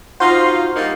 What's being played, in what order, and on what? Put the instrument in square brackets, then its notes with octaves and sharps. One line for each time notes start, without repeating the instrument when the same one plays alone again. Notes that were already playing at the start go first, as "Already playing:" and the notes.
[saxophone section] D#4 F4 [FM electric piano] F#4 C5
[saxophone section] G3 A#3 D#4